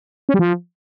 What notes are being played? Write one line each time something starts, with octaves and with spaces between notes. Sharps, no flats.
C#4
G3
F3